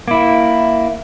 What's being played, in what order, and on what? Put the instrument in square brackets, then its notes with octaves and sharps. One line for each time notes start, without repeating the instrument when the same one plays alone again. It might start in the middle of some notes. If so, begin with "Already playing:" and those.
[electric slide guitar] A#3 E4